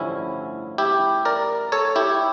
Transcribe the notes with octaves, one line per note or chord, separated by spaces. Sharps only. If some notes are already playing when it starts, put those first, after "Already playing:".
Already playing: A1 G2 D3 F3 C#4 E4
E4 G4
A#4 D5
A4 C#5
E4 G4